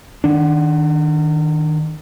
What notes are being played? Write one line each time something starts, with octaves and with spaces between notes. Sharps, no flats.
D#3 D4